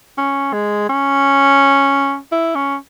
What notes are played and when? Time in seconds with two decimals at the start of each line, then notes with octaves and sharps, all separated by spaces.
0.18 C#4
0.53 G#3
0.89 C#4
2.32 E4
2.55 C#4